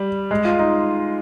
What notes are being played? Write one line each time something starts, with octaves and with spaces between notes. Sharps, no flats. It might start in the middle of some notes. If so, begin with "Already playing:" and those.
Already playing: G3
G#3
F4
D#4